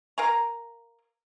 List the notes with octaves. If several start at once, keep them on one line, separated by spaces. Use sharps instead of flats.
A#4 F5 G#5 A#5